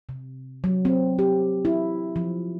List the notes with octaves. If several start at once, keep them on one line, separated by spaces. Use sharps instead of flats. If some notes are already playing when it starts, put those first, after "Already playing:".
C3
F#3
C4
G4
E4
F3